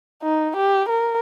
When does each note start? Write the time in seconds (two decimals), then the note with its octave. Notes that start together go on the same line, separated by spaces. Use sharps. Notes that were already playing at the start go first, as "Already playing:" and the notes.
0.23 D#4
0.56 G4
0.89 A#4